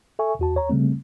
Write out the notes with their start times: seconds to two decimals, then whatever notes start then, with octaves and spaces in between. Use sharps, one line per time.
0.19 A4 E5 G#5 C#6
0.39 E2 F#4 A5
0.55 D#2 C#5 A#5
0.69 C#3 G3 A3 C4